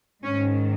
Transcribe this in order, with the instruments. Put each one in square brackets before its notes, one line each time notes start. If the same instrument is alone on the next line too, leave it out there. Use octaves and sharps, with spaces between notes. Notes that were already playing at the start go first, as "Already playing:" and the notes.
[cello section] G#2 D#3 C#4